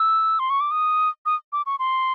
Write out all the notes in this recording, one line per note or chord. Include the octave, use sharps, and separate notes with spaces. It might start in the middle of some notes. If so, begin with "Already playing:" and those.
Already playing: E6
C6
C#6
D6
D#6
D#6
D6
C#6
C6